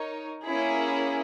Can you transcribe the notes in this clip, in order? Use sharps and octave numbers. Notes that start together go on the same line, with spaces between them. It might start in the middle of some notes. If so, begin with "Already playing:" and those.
Already playing: D#4 A#4 C#5
A#3 C#4 E4 G#4